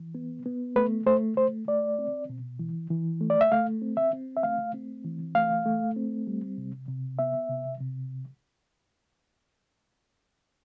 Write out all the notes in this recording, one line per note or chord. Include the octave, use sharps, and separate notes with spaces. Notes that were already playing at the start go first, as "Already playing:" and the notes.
Already playing: E3
B3
B3
A3 B4
A3 C5
A3 C5
A3 D5
C4
B2
E3
E3
A3
D5
E5
A3 F5
C4
E5
C4
E5
A3 F5
C4
E3
A3 F5
A3
C4
G3
C3
C3
B3 E5
C3
C3